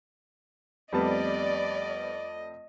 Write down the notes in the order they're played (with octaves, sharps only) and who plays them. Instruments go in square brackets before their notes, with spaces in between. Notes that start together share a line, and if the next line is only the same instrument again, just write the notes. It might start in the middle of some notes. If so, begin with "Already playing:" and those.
[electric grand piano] F2 A3 C4 [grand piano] G3 B3 A5 [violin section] D5 [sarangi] D#5